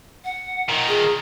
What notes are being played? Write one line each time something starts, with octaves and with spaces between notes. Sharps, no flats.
F#5
A#2 D#3
G#4